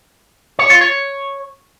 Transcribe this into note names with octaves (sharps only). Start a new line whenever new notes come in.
C#5
F4
C#5